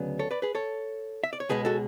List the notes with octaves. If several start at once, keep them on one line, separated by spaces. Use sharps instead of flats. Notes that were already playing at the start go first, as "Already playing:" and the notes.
Already playing: D2 C#3 F#3 B3
A4 C#5
B4 D5
G#4 B4
A4 C#5
E5
D5
C#5
C#2 B2 G#3 G#4 B4
F#4 A4